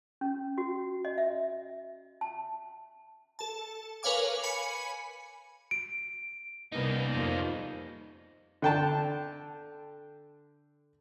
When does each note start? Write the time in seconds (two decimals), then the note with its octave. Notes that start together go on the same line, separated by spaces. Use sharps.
0.21 C#4
0.58 F#4
1.05 D#5
1.18 E5
2.21 A5
3.39 A4 A5
4.03 A#4 B4 C#5 F5 G#5 D6
4.43 G#5 B5 C#7
5.71 D7
6.72 C2 G3 A#3 B3 D#4
7.13 F2 F3 A#3
8.62 D3 G5 A5